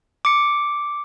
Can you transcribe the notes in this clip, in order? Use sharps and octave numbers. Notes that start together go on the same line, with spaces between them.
D6 C#7